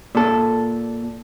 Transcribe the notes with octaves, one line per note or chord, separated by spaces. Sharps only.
A#2 A4